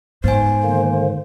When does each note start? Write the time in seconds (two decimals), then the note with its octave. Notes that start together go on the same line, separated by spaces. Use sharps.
0.24 G#2 B3 C5 G#5
0.64 D3 D#3 A#3